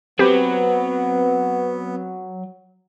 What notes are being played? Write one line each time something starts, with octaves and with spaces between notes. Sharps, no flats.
F#3 B3 C4 G4 B4